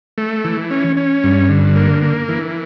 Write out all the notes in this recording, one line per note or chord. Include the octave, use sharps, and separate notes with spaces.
A3
E3
C#4
C#4
G2
D3
A#3
A#3
E3